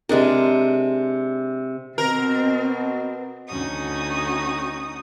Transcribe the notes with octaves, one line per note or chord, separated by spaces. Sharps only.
C3 G#3 D4 A#4
B2 C4 A#4
D2 C#4 D#4 F#4 D#6